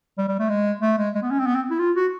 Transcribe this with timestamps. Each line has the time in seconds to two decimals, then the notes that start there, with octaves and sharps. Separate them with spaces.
0.18 G3
0.28 G3
0.39 A3
0.49 G#3
0.81 A3
0.98 G#3
1.15 G#3
1.22 B3
1.31 C#4
1.39 C4
1.47 B3
1.55 C4
1.70 E4
1.79 F4
1.95 F#4